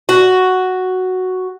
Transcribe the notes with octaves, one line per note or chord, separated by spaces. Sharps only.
F#4